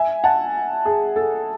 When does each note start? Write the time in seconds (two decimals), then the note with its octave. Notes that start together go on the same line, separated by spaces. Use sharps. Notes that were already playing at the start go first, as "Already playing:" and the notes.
Already playing: E5 G#5
0.24 F#5 A5
0.85 G#4
1.16 A4